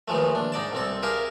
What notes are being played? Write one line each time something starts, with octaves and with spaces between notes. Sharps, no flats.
D#2 E3 F3 G#3 A3
D4
G#2 D#4 D5 A5
C2 C4 A4
G4 G#4 A#4 E5 F5